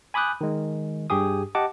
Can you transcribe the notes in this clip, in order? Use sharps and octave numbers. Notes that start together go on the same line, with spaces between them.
G#5 B5 D6 D#6 F#6 G6
D#3 G#3
G2 G4 G#4 D#6
G4 D#5 F#5 A5 D6